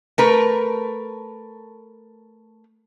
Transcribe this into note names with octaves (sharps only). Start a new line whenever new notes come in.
A3 A#4 B4